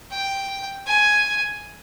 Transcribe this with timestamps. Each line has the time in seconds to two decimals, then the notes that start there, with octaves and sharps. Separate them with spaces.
0.11 G5
0.86 G#5